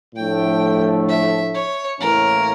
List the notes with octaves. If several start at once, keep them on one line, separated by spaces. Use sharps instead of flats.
A2 F3 A3 D4 G5
E5
C#5
A2 E3 A#3 C#4 A#4